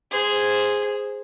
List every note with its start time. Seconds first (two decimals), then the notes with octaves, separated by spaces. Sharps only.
0.11 G#4 C5